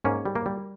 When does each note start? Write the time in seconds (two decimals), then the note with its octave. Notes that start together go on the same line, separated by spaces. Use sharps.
0.04 G#2 A#3 C#4
0.25 G3
0.35 A#3
0.46 G3